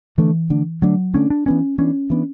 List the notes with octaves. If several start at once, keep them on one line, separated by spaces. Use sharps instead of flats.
D3 E3 A3 D4
D3 A3 D4
D3 F#3 A3 D4
D3 A3 C#4 D4
D4
E3 B3 C#4 D4
E3 B3 C#4 D4
E3 B3 D4